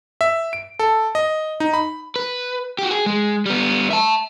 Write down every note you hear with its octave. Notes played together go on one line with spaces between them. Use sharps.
E5
D7
A4
D#5
D#4
B5
B4
F#4 G4
G#4
G#3
G3 B3
E5 A5